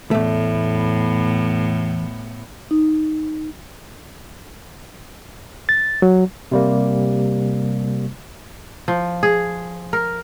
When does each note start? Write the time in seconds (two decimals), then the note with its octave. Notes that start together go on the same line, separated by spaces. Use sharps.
0.11 E2 A2 A3 B3
2.71 D#4
5.69 A6
6.02 F#3
6.52 C3 G3 A#3
8.88 F3
9.23 G#4
9.93 A#4